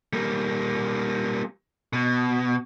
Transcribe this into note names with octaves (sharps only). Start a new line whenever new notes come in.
G3 A#3
B2